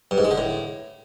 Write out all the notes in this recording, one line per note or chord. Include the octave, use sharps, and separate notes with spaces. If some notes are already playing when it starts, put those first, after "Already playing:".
G2
G#2
G#3
D3
A2